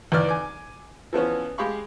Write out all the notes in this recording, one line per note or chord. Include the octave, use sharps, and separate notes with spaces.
D#2 E3 B4 D5 F6
G#5 D6
E3 F3 B3 C#4
G#3 G4 F5 B5 C#6